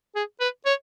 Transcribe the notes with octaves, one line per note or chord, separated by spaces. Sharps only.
G#4
B4
C#5